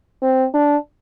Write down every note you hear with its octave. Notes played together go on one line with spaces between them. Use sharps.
C4
D4